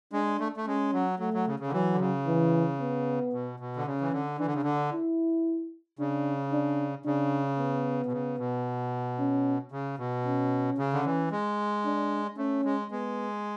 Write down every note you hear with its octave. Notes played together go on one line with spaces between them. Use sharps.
G#3 D4
A3
A3
G#3 C#4
F#3
F#3 A3
F#3
C#3
C#3
D3
E3 F#3
D3
C#3
E3
B3
B2
B2
D3
C#3 C#4
E3
D3
E3 D4
D3
C#3
D3
E4
C#3 D4
D4
C#3 D4
B3
B2
C#3
B2
C#4
C#3
B2
C#4
C#3
D3
E3
G#3
D4
A3 C#4
G#3
G#3 B3